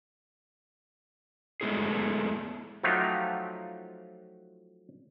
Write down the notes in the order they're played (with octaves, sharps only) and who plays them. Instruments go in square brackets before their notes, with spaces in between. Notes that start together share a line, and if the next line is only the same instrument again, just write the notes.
[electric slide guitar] G#3 A3 B3 E4 G#4
[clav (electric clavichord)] F3 F#3 A3 D#4 F4 G4